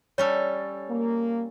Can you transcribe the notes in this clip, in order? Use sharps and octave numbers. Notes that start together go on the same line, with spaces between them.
G3 C#4 A4 C#5
A#3